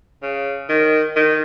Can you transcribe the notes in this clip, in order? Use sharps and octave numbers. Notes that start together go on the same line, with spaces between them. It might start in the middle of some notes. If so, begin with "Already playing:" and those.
C#3
D#3
D#3